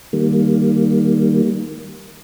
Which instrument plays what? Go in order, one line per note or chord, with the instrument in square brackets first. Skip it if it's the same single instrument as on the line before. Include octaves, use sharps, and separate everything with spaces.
[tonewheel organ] D#3 G3 A#3